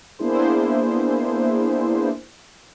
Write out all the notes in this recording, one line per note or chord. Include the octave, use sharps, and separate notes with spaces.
A#3 B3 D4 E4 G#4 C5